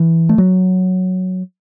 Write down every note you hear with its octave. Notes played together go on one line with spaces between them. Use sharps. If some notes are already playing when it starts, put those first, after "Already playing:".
Already playing: E3
A3
F#3